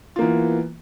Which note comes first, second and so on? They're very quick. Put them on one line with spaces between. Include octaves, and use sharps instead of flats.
F4 A#3 E3 B3